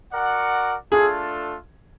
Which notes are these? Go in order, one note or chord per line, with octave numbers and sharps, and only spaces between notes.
F#4 A#4 D5 F#5
A3 D4 F4 G#4 A4